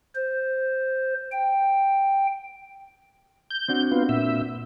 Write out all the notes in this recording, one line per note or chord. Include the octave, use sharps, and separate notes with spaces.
C5
G5
G6
C4 D4 F#4
B3 F4
A#2 E5